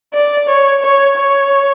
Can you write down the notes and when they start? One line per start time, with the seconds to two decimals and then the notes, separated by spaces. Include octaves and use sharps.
0.14 D5
0.48 C#5
0.83 C#5
1.17 C#5